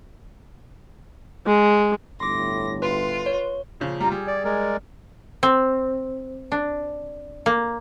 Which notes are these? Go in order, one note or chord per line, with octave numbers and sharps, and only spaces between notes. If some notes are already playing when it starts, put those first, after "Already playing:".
G#3
G1 A2 C6 D6 A#6
F4 B4 C6
C#5
A#2 C#3 F3
G3 F4 A#5
G3 G#4
D5
G#3 A#4 D5
C4
D4
A#3